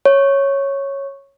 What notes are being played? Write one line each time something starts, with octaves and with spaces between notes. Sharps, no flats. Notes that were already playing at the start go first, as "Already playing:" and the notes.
C#5